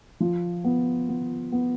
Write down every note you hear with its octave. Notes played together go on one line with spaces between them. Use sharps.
F3
B3
B3
B3